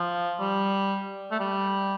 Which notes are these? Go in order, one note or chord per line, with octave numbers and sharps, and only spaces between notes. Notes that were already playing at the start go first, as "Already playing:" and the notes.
Already playing: F3
G3
A3
G3